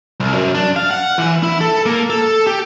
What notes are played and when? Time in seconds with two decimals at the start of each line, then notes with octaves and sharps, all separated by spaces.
0.20 C2
0.34 F#2
0.55 D4
0.76 F5
0.91 F#5
1.18 E3
1.43 E4
1.61 A4
1.86 A#3
2.10 A4
2.47 G4